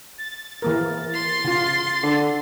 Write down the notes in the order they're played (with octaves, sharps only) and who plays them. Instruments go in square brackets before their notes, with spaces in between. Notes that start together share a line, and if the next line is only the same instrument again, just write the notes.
[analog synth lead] A6
[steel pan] E3 A#3 A#4
[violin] C6
[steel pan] C#3 F4
[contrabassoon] D3